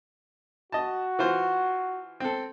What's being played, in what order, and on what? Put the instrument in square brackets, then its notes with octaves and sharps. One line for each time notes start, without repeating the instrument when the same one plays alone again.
[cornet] F#4 [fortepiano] D#5 A5
[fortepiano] E3 F4 C5
C4 A4